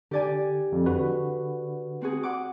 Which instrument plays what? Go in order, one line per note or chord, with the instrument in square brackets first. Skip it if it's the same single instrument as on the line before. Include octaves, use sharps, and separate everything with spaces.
[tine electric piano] D3 [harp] G4 D5 G#5
[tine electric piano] F2
D3 F#4 B4
[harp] C4 F#4 G#4
F#5 D6